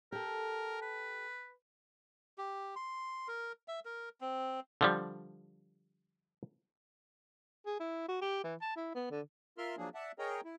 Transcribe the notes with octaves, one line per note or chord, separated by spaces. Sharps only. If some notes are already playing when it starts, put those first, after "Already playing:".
G4 A4 A#4
B4
G4
C6
A#4
E5
A#4
C4
D3 F3 G3
G#4
E4
F#4
G4
E3
A5
E4
B3
D3
F4 A#4 E5 C6 F6
F3 F#3 A#3 D4 G#4
D5 E5 F#5 A5
G#4 A#4 C#5 D#5 G5 A#5
E4